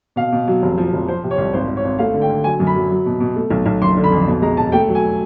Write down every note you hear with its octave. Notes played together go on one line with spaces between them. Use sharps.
B2 F5
B2
F#3
F1
F3
F1
F3 C5
C3
C#5
C2
G#1 C5
G#1
C#5
G#1
A3 F5
D3
G5
D3
F#3 G#5
F#2
B5
F#3
F#3
B2
B2
A3
B1
B1
F#1 C6
D3
B5
F2
B2
G#3 A#5
E1 A5
A3 G5
F#3
G#5